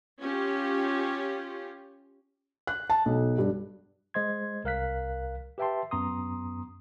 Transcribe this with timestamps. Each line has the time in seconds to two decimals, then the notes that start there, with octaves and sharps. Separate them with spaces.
0.19 C#4 F4 G4
2.67 F#6
2.90 A5
3.06 B1
3.38 G2
4.14 G#3 C5 D#5 C6 G#6
4.64 C2 A#4 F5 F#6 B6
5.58 G4 B4 E5 G5 A5 C6
5.91 F#2 B3 A#5 C6 D#6